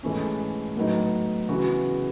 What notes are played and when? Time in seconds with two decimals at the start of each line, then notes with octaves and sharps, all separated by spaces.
0.03 G#2 E3 A3 C#4
0.76 A2 F#3 B3 D#4
1.49 C#3 E3 B3 F#4